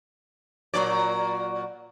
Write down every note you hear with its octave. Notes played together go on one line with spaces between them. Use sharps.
A#2 F#3 D5